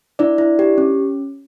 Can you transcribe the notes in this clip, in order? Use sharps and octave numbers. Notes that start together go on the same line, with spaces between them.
D4 E4 D5
E4
G4
C#4